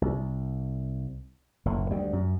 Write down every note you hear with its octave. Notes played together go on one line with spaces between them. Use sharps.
C2
F#1 A2
D2 G3
F#2